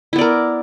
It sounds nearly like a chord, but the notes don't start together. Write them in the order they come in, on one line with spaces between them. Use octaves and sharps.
E4 B3 D5 A#4